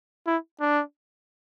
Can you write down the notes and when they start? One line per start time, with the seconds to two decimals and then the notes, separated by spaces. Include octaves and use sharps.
0.27 E4
0.61 D4